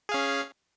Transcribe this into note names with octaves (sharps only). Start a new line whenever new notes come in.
C#4 G#4 F5